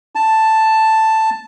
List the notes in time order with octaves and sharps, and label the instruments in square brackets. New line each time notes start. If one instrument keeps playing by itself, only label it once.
[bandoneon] A5